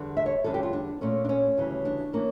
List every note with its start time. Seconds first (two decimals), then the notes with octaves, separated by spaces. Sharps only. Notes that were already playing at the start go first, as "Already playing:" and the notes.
Already playing: E2 D3 G3
0.17 E5
0.26 C#5
0.44 E2 D3 G3 C#4 A4
0.54 G4
0.63 F4
0.73 D4
1.01 A#2 A3 C#4
1.25 D4
1.29 C#4
1.57 D2 C#3 E3 G3
1.85 D4
2.13 E3 A#3 C#4